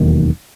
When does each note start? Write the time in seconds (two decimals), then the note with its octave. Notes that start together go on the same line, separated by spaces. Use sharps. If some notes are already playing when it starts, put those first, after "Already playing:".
Already playing: E1 D#2 D#3 F#3